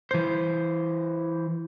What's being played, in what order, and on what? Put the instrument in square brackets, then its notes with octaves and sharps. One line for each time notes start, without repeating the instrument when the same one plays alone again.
[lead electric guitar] E3 C5